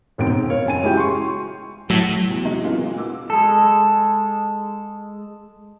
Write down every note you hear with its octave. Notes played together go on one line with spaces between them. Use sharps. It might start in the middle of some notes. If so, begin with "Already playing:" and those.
E1 D#2 G#2 B2 C4 D7
C4
A#4 C#5 F5
F#1 C#3 G#5 D#7
G#3 C#4 E4 F#4 G4 G5
C6 C#6
A2 F#3
E2 F#3
A2 C3 F#3 G#3 D#4
C#3 E3 G#3 B3 F4
A#2
F#4 D6 E6
G#3 A4